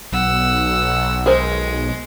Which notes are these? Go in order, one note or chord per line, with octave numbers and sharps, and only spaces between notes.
B1 F#5 E6
G#3 G#4 A#4 C5